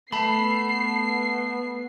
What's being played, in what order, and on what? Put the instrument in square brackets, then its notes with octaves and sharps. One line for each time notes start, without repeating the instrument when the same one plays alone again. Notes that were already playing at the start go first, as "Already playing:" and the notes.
[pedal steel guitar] A3 [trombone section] B3 [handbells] A5 B5 [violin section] C7